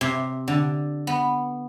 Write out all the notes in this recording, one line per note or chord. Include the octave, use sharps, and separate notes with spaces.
C3
D3
B3